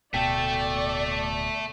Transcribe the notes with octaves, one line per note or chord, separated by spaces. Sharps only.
D1 B2 A3 A4 D5 G5